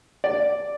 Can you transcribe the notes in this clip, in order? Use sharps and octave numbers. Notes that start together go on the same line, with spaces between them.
D5